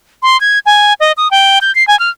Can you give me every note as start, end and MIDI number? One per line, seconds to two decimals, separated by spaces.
0.23 0.40 84
0.41 0.59 92
0.66 0.93 80
1.00 1.12 75
1.17 1.30 87
1.31 1.59 79
1.61 1.74 91
1.75 1.86 96
1.88 1.98 80
1.99 2.10 89